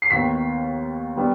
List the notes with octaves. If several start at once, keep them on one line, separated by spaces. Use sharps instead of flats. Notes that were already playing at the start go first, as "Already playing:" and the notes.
C7
D#2 D#3 B3 B6
D#3 G3 B3